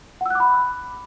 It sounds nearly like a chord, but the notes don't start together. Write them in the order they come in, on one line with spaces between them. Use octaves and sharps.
F#5 E6 F#6 D6 B5